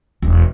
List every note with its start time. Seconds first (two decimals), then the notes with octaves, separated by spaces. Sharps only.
0.22 E1